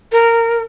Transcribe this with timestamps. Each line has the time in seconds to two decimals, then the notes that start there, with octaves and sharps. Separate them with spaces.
0.12 A#4